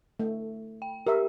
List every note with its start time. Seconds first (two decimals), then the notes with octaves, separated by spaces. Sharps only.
0.20 A3
0.82 G5
1.07 G4 A#4 E5